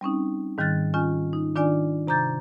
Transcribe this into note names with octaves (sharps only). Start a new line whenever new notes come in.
G3 C4 C#4 D#4
G#2 D#3 G3 F6 F#6 A6
D#3 C#4 F4 G#5 F6
D#4
D#3 D4 F4 D5 G#5
C3 A#5 D6 G6 A6